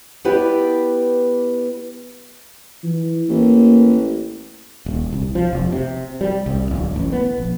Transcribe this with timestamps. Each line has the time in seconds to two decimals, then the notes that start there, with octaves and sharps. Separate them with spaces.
0.24 B3 E4 G4 B4 D5
2.83 E3
3.29 A1 A#3
4.86 D#1
5.13 C2
5.35 F3
5.53 F1
5.72 C3
6.21 G3
6.46 C2
6.71 D1
6.96 A1
7.12 B3
7.38 A#1